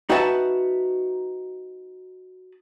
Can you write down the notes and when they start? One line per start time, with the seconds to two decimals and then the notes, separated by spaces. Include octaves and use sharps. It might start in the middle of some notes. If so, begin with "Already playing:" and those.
0.10 D#4 F#4 B4 E5 G#5 A5